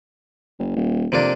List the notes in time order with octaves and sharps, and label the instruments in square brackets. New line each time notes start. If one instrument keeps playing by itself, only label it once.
[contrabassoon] F#1
D#1
[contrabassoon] F2 [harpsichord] C3 A#3 D4